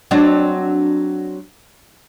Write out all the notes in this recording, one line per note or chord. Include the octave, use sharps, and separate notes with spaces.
F#3 C4 D4